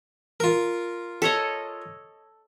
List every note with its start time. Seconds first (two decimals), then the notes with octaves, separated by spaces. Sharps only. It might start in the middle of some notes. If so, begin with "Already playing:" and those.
0.40 F4 A#4
1.22 A4 C#5 D#5